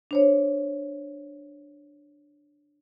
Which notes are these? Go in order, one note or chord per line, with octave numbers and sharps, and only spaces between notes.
D4 C5 C#5